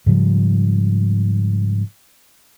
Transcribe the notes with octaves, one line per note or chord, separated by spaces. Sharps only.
G#2 C#3 F3 G3